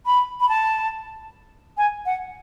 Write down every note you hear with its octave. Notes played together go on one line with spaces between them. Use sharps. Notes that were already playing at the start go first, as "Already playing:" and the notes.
B5
B5
A5
G#5
F#5